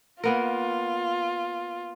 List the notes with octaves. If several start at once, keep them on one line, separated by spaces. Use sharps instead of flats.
A#3 B3 F4 A#4